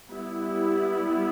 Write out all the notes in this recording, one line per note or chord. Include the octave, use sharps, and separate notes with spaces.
G3 B3 E4